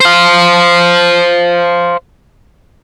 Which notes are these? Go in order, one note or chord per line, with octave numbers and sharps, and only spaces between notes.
C5 F5